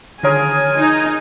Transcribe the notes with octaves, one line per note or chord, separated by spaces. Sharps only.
D3 D#3 F4 G#4 A#4 C#5 G#5
D#4